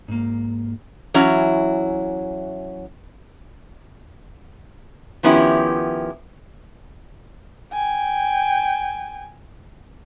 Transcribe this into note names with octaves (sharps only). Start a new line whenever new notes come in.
G#2 A#3
E3 F#3 C#4 E4
D#3 F3 B3 C#4 E4 G4
G5 G#5